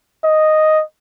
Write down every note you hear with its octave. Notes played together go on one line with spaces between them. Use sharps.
D#5